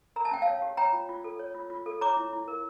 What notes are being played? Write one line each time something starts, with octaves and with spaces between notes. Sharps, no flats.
A#4 A#5
A5
C#4 G5
F5 A5
C#5
G4
C#5 G5 A#5
F4
F4
A4
C#5
F4
F4
A4
C#5 A#5 D6
E4
E4
A#4